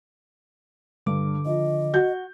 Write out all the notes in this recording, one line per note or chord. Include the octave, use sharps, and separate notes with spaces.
G2 D3 D6
F3 D#5
F#4 G6